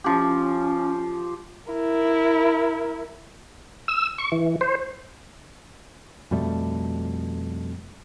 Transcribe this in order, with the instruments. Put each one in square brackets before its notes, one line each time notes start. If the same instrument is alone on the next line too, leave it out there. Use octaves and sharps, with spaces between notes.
[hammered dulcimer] F3 G4 [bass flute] C#4
[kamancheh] E4 A#4
[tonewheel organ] E6
C#6
E3
C5
[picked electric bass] F2 B2 G3 A3